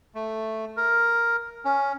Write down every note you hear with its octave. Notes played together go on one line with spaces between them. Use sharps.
A3
A#4
C#4